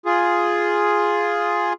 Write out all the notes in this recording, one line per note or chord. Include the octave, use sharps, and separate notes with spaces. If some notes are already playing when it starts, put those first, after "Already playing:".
F4 G#4